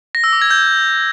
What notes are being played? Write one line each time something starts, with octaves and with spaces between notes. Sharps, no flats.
A#6
E6
D6
G#6
G6